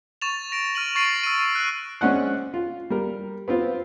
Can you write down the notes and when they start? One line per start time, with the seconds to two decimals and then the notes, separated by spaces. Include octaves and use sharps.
0.22 C#6 A6 E7 F7
0.52 A#6 D7
0.75 F6 D#7 F#7
0.95 C#6 A6 C7 D7 D#7 F#7
1.24 E6 D#7
1.55 F#6
2.01 G#3 C4 C#4 D5 F#5 F#6
2.54 F4
2.90 G3 A#4
3.48 B3 C4 F4